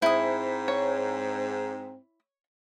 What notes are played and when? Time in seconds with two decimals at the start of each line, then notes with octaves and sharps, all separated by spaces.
0.02 G#2 C4 E4 D#6
0.68 C#5